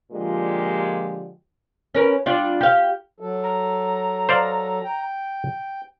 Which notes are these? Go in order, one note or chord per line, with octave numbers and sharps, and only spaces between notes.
A#2 D3 F3 G#3 G4
C#4 A#4 B4
G3 D4 F4
G4 F5
F#3 A4
A#5
C5 D5 F5
G5